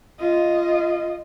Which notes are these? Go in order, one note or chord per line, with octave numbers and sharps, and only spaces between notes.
F4 D#5